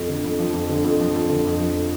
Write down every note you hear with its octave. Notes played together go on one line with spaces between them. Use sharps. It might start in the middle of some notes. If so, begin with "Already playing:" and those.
Already playing: F2
D3
F2
F3
F2
D3
F2
F3
F2
D3
F2
F3